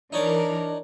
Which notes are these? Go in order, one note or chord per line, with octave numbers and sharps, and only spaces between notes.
E3 D4 D#4 A#4 C#5 D5